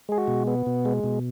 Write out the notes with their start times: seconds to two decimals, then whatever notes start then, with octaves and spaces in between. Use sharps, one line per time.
0.09 G#3 G#4
0.18 F#4
0.28 B2
0.47 B3
0.66 B2
0.85 G#3
1.04 B2